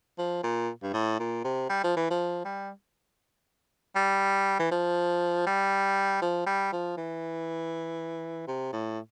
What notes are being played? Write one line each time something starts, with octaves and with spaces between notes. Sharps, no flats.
F3
A#2
G2
A2
A#2
C3
G3
F3
E3
F3
G3
G3
E3
F3
G3
F3
G3
F3
E3
C3
A2